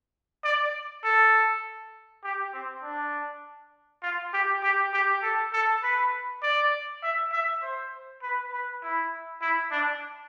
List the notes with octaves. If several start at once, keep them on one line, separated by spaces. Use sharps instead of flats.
D5
A4
G4
C4
D4
F4
G4
G4
G4
A4
A4
B4
D5
E5
E5
C5
B4
B4
E4
E4
D4